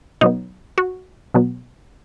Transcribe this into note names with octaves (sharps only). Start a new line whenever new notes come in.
B2 F#3 B3 D#4
F#4
B2 F#3 B3